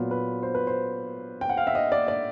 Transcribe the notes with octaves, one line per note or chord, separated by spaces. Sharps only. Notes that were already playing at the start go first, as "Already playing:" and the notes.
Already playing: A#2 F#3 B3
B4
C5
B4
C5
G5
F#5
F5
E5
D#5
D5
D5